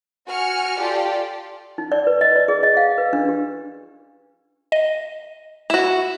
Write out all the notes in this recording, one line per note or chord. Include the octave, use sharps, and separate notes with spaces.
F#4 G#5 F6 C#7
F4 G4 A4 D5
D#4
D5
B4
D#5
D5
G#4
D#5
F5
B4
D4
G4
D#5
E4 F#4 E7